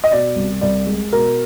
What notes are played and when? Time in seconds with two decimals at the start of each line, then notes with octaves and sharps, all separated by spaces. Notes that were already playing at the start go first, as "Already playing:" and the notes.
0.04 D#5
0.11 B2 D5
0.36 C2
0.61 C2 D5
0.86 G#3
1.12 B2 A#4